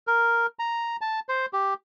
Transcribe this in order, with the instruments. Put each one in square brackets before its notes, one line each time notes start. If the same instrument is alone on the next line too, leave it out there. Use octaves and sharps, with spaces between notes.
[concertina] A#4
A#5
A5
C5
G4